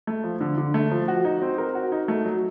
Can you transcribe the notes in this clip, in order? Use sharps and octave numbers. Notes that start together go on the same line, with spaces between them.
A3
F3
D3
D3
A3
F3
F#4
D#4
C4
A#4
F#4
D#4
A3
F#3